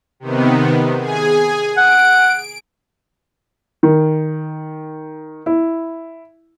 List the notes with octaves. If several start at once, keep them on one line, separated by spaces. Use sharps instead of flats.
C3 D#3 B3
G#4 G#5
F#5 D7
D#3
E4